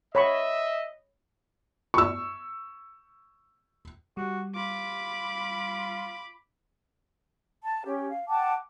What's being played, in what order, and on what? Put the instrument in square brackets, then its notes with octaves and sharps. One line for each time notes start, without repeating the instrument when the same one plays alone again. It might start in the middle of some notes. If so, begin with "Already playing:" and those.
[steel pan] C#5 B5 C#6 [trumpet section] D#5 E5
[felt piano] C#6 E6
[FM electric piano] G3 [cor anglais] F#4
[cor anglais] F4 [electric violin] B5 D6
[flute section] A5
C#4 G4
F5
F#5 G5 A5 D6